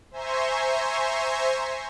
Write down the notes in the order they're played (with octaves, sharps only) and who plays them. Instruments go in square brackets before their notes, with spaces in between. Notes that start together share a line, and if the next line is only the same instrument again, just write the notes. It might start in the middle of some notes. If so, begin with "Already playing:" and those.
[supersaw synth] C5 E5 G#5 A#5 C6 C#6